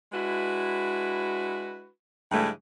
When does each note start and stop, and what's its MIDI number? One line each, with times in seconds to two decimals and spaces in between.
0.13 1.88 56
0.13 1.88 62
0.13 1.88 64
0.13 1.88 66
0.13 1.88 71
2.32 2.49 43
2.32 2.49 49
2.32 2.49 52
2.32 2.49 56
2.32 2.49 57